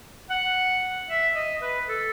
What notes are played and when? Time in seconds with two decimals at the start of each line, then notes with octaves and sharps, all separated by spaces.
0.30 F#5
1.09 E5
1.35 D#5
1.62 B4
1.89 A4